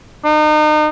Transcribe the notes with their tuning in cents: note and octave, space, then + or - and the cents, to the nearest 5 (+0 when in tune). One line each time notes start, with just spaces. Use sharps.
D#4 -35